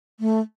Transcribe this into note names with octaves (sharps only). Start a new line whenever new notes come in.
A3